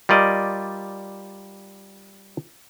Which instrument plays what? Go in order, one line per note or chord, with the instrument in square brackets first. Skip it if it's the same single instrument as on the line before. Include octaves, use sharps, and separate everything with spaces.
[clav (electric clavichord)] G3 F4 A#4 D5 D#5